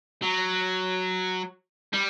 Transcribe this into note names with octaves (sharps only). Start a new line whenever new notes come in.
F#3
G3